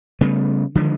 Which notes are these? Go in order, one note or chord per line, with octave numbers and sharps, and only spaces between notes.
C#3 G3 A3 B3
D3 D#3 F3 G#3